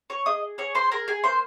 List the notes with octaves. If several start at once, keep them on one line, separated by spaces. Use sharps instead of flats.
C#5 C#6
G#4 D#5 D#6
G#4 C#5 C#6
C5 C6
G#4 A#4 A#5
G#4 G#5
A#3 C5 C6